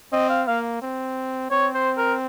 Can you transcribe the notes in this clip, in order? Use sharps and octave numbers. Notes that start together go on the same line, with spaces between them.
C4 D#5
F5
A#3 F5
C4
C4 C#5
C5
A#4